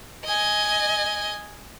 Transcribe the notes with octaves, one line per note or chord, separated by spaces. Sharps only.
D#5 G#5